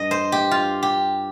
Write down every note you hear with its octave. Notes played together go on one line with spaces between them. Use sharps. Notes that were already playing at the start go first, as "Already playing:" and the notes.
Already playing: G2 D#5
C5
G4
F4
G4